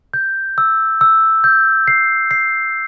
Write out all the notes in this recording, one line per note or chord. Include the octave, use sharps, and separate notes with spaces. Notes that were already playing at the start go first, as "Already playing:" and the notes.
G6
E6
E6
G6
C7
C7